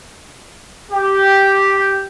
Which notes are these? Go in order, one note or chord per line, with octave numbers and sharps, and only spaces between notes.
G4